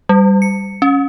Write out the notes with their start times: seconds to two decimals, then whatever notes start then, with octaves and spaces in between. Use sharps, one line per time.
0.09 G3
0.42 C#7
0.82 C#4